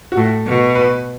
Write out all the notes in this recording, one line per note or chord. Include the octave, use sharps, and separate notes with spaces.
F#4
A2 A4
B2
B4